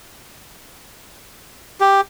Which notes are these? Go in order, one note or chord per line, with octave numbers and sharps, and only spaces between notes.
G4